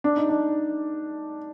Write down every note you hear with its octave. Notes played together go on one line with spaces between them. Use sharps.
D4
D#4
D4